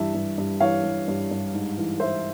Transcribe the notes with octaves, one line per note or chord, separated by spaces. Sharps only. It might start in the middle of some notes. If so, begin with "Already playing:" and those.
Already playing: G2 E3 E5
G2
G2
E3 C#5 F5
G2
G2
G2
G#2
E3
E3 C5 E5